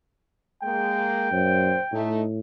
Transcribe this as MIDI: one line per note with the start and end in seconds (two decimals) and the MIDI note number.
0.63 1.31 56
0.63 1.31 58
0.63 2.13 79
1.32 1.74 42
1.32 1.80 46
1.32 1.80 72
1.92 2.40 45
1.92 2.22 57
1.92 2.22 63